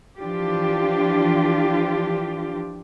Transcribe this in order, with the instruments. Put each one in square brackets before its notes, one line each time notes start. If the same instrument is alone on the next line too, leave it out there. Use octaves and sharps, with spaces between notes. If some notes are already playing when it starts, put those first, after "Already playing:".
[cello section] E3 F3 D4 F4 G4